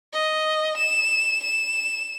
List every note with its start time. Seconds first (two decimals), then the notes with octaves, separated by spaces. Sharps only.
0.13 D#5
0.77 E7
1.42 E7